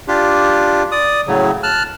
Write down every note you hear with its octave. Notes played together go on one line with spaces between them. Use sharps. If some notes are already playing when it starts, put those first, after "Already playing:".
D4 F4 G4
D5 D#6
A2 C#3 F#3
A5 F6 F#6